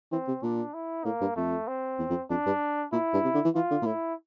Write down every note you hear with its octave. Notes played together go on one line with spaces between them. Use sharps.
E3 C4
C3
A#2 D4
E4
A2 A#3
G2
F2 A3
C4
E2
F2
F2 D4
G2
A#2 E4
G2
C3
D3
E3
E3 F4
D3
A#2
A2 E4